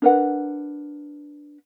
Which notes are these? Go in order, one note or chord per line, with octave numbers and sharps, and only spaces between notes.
D4 A#4 B4 F#5